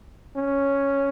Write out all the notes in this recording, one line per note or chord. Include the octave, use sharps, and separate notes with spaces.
C#4